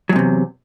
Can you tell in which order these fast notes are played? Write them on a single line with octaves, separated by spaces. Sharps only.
F#3 G#2 C3 E2